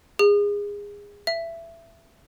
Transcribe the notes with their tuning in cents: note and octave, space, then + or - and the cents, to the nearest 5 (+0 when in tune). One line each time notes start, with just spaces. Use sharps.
G#4 -25
E5 +20